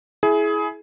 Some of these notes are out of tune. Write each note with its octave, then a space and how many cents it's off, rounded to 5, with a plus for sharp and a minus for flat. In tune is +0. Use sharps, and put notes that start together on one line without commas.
E4 +0 G#4 +20